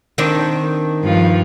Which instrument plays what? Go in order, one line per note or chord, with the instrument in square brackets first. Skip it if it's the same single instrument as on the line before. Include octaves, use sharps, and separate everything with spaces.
[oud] D#3 C4 D4
[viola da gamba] G2 F3 F4